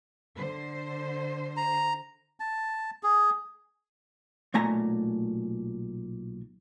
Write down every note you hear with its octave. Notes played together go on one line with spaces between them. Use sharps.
D3 C5
A#5
A5
G#4
B1 A#2 A3 G#5 A#5